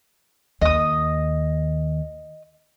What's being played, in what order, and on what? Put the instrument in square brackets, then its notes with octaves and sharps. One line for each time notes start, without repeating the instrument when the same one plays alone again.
[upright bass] D#2 [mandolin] D#5 D#6